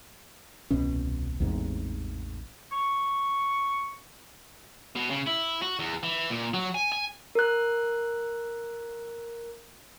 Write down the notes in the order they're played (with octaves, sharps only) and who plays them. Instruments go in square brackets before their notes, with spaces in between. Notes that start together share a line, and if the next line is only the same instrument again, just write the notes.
[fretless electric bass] D#1 C2 B2 C#4
A1 E2 G#2 C3
[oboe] C#6
[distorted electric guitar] B2
C#3
E4
F#4
E2
E3
A#2
F#3
G#5
G#5
[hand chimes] A#4 F#6